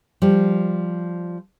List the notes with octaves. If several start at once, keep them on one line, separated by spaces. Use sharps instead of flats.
F3 G3